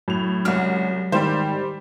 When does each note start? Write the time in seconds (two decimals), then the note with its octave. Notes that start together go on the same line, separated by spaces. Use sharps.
0.08 A2 F#3 F7
0.45 C2 C#3 G#3 F#4 F6
1.12 G#2 D#3 G3 G4 C5